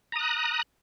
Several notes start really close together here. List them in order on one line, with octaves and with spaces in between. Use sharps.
A#5 D#6 F#6